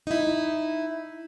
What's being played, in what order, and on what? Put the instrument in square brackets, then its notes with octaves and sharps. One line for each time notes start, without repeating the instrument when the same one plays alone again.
[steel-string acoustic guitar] D#4 E4